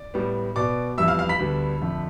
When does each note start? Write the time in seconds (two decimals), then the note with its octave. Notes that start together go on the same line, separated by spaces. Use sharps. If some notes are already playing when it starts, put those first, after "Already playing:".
Already playing: D5
0.14 A2 G3 B3
0.56 B2 B3 D5 D6
0.98 F2 E3 G3 B3 E5 E6
1.08 F5 F6
1.19 F5 F6
1.29 B5 B6
1.39 D2 D3 G3 B3
1.81 F2 D3 A3